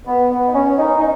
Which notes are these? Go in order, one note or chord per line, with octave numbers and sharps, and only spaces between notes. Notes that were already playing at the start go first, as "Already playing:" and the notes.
B3
B3
D#4
C#4
D#4
D#4